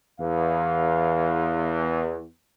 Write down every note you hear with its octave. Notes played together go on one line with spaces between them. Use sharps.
E2 F5